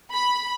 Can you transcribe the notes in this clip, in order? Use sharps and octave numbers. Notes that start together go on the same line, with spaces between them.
B5